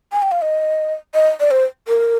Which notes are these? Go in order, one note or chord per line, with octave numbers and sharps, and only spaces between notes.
G#5
G5
F5
D#5
D#5
D5
C5
A#4